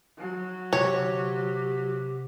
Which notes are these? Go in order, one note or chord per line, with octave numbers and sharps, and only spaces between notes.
F#3
C3 G4 C#5